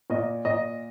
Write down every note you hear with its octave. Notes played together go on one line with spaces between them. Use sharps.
A#2 D#5
A#2 D#5